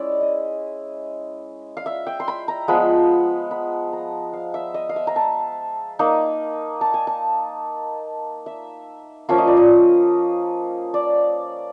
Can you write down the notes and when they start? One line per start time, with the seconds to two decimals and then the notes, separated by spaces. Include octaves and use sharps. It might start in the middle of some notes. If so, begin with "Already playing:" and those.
Already playing: G#3 C#4 E4 D5
0.21 D#5
1.77 F5
1.86 E5
2.07 G5
2.20 C6
2.28 B5
2.48 A#5
2.68 F3 G#3 B3 B5
3.51 B5
3.93 A#5
4.33 F5
4.54 E5
4.74 D#5
4.89 F5
4.96 E5
5.07 A#5
5.16 A5
5.99 A#3 D#4
6.81 A5
6.94 G#5
7.07 A5
8.46 E5
9.29 F3 A#3 C#4 F4 E5
9.38 D#5
9.48 D5
9.57 D#5
10.94 D5